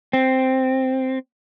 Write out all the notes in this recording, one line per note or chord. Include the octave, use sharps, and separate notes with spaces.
C4